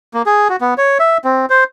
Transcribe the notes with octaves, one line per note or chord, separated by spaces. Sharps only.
A#3
G#4
F#4
B3
C#5
E5
C4
C5